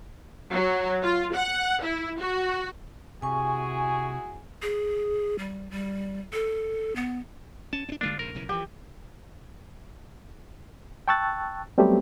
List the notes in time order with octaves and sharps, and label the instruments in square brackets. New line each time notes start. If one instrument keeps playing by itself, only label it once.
[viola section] F#3
F4
F#5
E4
F#4
[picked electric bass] C3 [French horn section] E4 F#4 G#4 [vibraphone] G#5 C#6
[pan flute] G#4
G3
G3
A4
B3
[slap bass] C#4 [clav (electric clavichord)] A5
[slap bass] C4 D4
[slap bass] D3 G#3 A#3 [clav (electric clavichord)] D4 F4
[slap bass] A#1 G#2 C#3 [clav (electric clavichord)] A#4
[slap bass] B1 C#3 E3
[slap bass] E3 F3 [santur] G4
[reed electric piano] G5 A5 C#6 E6 F#6 A6
F#3 G3 A3 B3 C4 G4